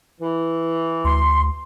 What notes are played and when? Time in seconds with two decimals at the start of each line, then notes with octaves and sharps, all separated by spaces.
0.20 E3
1.04 D2 C6